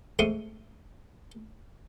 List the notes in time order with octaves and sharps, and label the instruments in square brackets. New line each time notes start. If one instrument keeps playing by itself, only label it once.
[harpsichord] G#2 A3 C4 F5 F#5 D#6